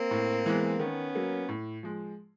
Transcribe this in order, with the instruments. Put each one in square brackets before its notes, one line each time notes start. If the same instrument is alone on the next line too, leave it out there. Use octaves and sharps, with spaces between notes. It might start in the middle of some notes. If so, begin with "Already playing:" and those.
Already playing: [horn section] A#3 C4
[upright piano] A2
E3 G#3 B3
[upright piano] D#3 [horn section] B3 C#4
[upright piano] F#3 A#3
A2
F3 G#3